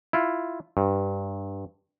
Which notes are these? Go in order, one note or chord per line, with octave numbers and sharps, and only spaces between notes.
E4 F4
G2